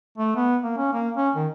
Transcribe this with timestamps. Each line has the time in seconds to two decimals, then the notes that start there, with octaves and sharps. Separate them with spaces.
0.18 A3
0.36 B3
0.63 A#3
0.77 C#4
0.93 A#3
1.17 C#4
1.36 D#3